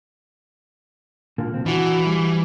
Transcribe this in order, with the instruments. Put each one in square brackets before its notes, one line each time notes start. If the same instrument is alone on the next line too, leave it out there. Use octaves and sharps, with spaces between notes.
[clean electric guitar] A#2 D3 A#3
B1 C4
[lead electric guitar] E3 [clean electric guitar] D4 F#4
[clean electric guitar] G3